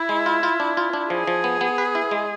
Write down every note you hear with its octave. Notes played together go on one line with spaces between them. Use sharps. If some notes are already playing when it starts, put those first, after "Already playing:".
Already playing: E4
G#3
F4
F4
D4
F4
D4
F3 G#4
F3
B3
B3
B4
E4
G#3